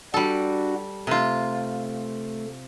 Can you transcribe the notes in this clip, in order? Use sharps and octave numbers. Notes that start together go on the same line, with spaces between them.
G3 D4 F#4 A4
C3 A3 F4